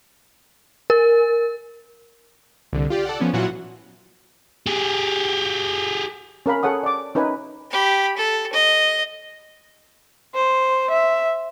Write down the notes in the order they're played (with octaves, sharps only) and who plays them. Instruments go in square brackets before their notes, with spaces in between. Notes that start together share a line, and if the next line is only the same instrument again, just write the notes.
[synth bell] A#4
[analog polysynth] C2 D3
F4 G4 D5
A4 D5 F#5
F3 B3 C#4
A#2 E3 F#3 F4 F#4 F#5
[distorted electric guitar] G4 G#4
[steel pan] C#4 A#4 F5 B5
G#4 A4 C#5 F#5 D#6
D5 D6
C#4 D#4 B4 E5 G#5
[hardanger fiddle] G4 B5
A4
D#5
[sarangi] C5
E5